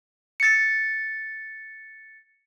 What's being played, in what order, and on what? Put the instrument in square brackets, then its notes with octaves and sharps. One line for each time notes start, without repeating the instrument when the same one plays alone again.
[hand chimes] A6 C#7